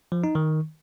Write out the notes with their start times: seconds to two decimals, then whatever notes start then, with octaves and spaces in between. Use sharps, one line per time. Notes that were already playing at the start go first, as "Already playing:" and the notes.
0.12 F3
0.24 D#4
0.35 D#3